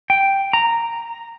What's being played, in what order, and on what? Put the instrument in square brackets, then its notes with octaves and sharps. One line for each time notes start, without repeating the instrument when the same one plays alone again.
[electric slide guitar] G5
A#5